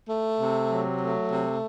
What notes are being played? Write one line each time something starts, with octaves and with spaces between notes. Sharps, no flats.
A3
C3
F#3
A3
C3